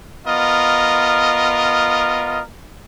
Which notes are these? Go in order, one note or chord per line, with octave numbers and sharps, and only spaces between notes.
B3 F4 A#4 D#5